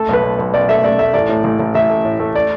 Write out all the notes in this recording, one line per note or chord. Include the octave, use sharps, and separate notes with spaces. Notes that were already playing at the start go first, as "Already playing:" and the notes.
Already playing: A3 A4
B1 B4
B1
B1
B1 D5
A3 E5
A3 D5
A3 E5
A1 D5
A2
A1
A1
A1 E5
A3
A2
A3
D5